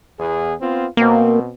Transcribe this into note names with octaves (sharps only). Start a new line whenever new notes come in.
E2 G#4
B3 C4 F4
B2 A#3 C4